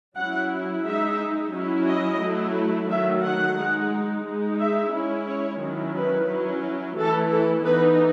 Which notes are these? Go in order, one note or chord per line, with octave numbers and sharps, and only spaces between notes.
F#3 C#4 E4 F#5
G#3 D#4 E5
F#3 C#4 E4
D#5
F#3 A3 E4
D#3 F#3 A3 E5
F#5
G#3 D#4
G#3 D#4
E5
G#3 C#4 E4
C#5
D#3 F#3 C#4 E4
B4
F#3 C#4 E4
E3 A3 E4 A4
A4
E3 B3 D#4 B4